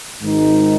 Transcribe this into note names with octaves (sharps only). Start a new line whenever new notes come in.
G#1 G#2 D#3 G#3 D#4